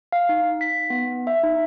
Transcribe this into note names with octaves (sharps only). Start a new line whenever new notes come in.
F5
D#4
B6
B3
E5
D#4